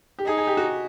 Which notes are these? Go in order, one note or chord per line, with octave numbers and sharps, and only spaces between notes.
G4
D#4 G#4
G#4
G4
F#4